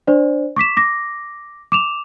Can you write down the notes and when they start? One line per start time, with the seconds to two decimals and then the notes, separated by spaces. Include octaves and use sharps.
0.07 D4 C5 D5
0.56 C#6 D6 B6 E7
0.77 D6 A#6
1.72 D6 E7 F7